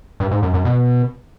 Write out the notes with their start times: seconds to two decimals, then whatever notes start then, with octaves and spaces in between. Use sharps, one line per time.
0.20 G2
0.31 G#2
0.43 F#2
0.54 F#2
0.65 B2